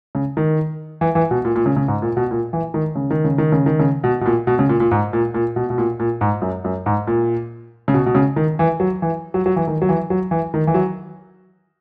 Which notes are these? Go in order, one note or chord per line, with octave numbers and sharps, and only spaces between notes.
C#3
D#3
E3
E3
B2
A#2
A#2
C#3
C#3
G#2
A#2
B2
A#2
E3
D#3
C#3
D#3
C#3
D#3
C#3
D#3
C#3
B2
B2
A#2
B2
C#3
A#2
A#2
G#2
A#2
A#2
B2
B2
A#2
A#2
G#2
F#2
F#2
G#2
A#2
C#3
B2
B2
C#3
D#3
E3
F#3
E3
F#3
F#3
E3
D#3
F#3
E3
F#3
E3
D#3
E3
F#3